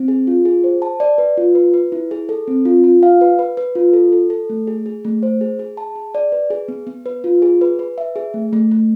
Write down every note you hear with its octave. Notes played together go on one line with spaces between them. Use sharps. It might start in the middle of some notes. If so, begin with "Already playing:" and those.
Already playing: C4
G#4
F4
G#4
C5
A5
D5
B4
F4
B4
B4
E4
G#4
A4
C4
F4
F4
F5
B4
B4
B4
F4
A4
A4
A4
A3
G#4
G#4
A3
C5
G#4
G#4
A5
G#4
D5
B4
G#4
B3
B3
B4
F4
G#4
B4
B4
E5
G#4
A3
A3
A3